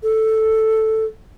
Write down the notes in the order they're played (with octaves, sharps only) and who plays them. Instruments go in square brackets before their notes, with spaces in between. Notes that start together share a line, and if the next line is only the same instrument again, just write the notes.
[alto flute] A4